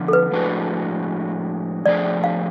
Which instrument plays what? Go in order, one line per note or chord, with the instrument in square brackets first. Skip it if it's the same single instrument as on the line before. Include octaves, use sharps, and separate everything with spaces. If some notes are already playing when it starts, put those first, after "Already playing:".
Already playing: [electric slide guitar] D3 F3 B3 F4
[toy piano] A4
B4
[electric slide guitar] A2 F3 G#3 D4 F#4
[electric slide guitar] F3 A3 D4 G#4 [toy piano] D5
[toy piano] F5